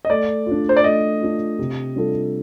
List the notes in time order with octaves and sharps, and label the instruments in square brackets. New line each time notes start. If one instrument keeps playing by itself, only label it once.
[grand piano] D#5
[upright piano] A3 [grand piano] D5
[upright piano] D4 F4
[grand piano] C5
D5
[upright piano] A3 [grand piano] D#5
[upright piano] D4 F4
C3
G3 D4 F4 A4